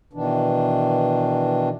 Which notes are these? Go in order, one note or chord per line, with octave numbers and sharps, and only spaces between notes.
B2 D#3 E3 D4